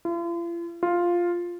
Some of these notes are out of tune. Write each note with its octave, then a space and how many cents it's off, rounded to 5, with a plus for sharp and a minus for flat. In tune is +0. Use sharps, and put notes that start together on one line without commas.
F4 -45
F4 +0